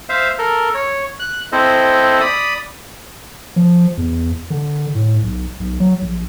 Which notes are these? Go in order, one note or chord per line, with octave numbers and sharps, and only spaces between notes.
C5 E5 F5
A4 A#4
C#5
F#6
C4 E4 A4 C5 D#5
D5 B5 D#6
F3
E2
D3
A2
B1
B1
F#3
A#1